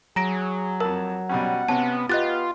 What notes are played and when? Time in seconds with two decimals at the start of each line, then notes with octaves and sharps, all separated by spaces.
0.16 F#3 G#4 A#5 A#6 D7
0.80 F2 A#4 A5
1.29 B2 G3 C#4 F#5
1.69 C3 B3 C#4 A5
2.09 B3 F4 G4 D#5 F#6 A6